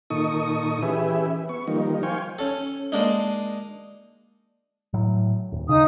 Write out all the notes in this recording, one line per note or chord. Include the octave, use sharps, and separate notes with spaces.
A#2 D#3 D#4 A4 C#6 D#6
E3 C#4 G4 G#4 B4 E5
B3 C#6
D#3 F3 G3 A#3 D#4
C5 F5 G5 G#5 C#6
C#4 A4
G#3 A#3 D4 D#4
A2 F#3
D#1
C#3 D#4 D#6